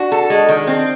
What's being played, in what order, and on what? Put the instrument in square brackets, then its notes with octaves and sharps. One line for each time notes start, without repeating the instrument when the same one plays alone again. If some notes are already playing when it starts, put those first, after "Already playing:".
Already playing: [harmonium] D4 [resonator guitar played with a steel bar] F#4
[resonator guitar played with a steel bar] A4
G#3
D#3
C4